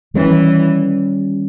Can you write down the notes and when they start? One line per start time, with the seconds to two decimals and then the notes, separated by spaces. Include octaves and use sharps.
0.14 D#3 E3 G3 A#3 C#4